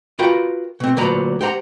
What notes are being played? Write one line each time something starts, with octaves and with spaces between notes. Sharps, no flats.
F4 F#4 A#4 B4 F5 G5
B2 C4
D2 A#2 F3 F#3 B4 A#5
G4 C5 F#5 A#5